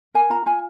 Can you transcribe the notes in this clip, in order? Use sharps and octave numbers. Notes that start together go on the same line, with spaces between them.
A#4 G#5
F4 A#5
F4 G#5